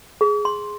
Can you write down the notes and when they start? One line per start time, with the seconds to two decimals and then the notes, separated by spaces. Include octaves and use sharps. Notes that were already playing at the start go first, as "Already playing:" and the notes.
0.21 G#4
0.45 C6